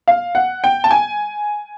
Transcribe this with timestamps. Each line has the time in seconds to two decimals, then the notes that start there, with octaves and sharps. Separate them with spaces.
0.08 F5
0.35 F#5
0.64 G5
0.84 A5
0.91 G#5